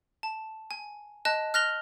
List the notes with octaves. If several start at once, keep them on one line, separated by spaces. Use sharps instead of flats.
A5
G#5
D#5 A5 F#6
F6 F#6 A#6 F7 G7